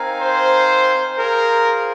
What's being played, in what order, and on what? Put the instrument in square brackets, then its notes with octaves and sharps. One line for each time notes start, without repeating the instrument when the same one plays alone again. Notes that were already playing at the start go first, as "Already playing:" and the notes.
Already playing: [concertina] C4 D#4 A#4 F5 G#5
[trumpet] C5
[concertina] F4 G#4 C5 [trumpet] A#4